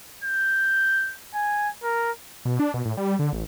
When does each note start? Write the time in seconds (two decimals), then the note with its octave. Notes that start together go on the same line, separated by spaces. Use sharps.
0.24 G6
1.35 G#5
1.83 A#4
2.45 B2
2.60 D4
2.74 B2
2.85 A2
2.97 G3
3.19 D3
3.33 A1